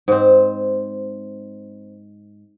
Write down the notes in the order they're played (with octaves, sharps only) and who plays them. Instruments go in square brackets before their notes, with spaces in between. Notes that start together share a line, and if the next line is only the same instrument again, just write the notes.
[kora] G#2 C4